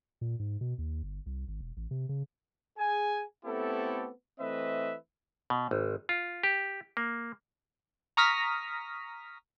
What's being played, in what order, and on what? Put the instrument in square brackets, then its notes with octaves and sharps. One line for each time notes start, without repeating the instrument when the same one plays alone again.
[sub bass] A#2
G#2
B2
D#2
G1
C2
G#1
E1
A1
C3
C#3
[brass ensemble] G#4 G#5
A3 B3 C4 E4 G4 A4
E3 A3 C4 B4 D#5 E5
[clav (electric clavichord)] B2
G#1
F4
G4
A#3
[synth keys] A#5 C#6 D#6 F6 A#6 B6